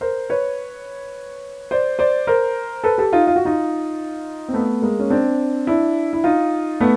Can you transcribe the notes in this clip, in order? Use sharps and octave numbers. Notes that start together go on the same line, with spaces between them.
A#4 C5
B4 C#5
C5 D5
C5 D5
A#4 C5
A4 B4
G4 A4
D#4 F4
F4
F#4
D#4 F4
C4
A3 B3
G#3 A#3
C#4
C4 D4
D4 E4
E4
D#4 F4
A3 B3